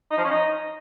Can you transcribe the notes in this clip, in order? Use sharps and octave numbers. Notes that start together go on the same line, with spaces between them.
D#4
F3
C#4
D#4